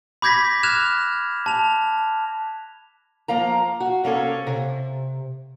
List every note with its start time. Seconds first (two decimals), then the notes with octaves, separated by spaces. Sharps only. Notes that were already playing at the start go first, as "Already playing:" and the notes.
0.22 B5 D6 G6 G#6 A#6 B6
0.63 F6 F#6 G#6 E7 F7
1.46 A5 F7
3.28 F3 A#3 F5 A#5
3.80 F#4
4.04 C3 A#3 C#4 A4 C#5
4.47 C3